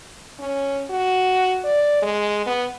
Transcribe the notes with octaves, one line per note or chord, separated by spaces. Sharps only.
C#4
F#4
D5
G#3
B3